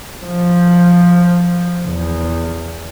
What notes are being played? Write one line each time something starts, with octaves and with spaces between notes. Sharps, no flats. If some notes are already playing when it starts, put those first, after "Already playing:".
F3
E2